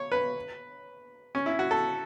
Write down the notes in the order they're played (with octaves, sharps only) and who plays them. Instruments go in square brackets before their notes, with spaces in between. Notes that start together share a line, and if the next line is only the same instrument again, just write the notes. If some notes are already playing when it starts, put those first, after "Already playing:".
Already playing: [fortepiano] C#5
B4
C#4
E4
F#4
A4